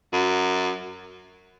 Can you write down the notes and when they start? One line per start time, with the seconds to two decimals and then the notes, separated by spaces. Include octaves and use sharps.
0.12 F#2